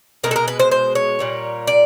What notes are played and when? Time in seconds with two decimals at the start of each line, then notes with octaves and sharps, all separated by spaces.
0.24 B2 G#3 A#4
0.31 A4
0.36 A#4
0.48 B4
0.60 C5
0.72 C5
0.95 C#5
1.19 A#2 G3 A#3
1.67 D5